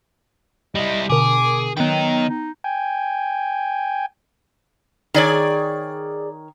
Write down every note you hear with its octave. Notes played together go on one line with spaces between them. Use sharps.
G3 E4 D#5
B2 D3 G#4 A#4 D6
D#3 F#3 B3 D#4 G5
D#4
G5 G#5
D#3 G#4 C#5 D5